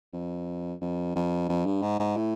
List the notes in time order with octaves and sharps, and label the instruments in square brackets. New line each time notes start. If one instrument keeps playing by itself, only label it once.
[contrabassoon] F2
F2
F2
F2
G2
G#2
G#2
A2